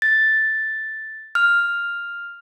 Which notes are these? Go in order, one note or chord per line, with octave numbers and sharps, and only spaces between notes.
A6
F6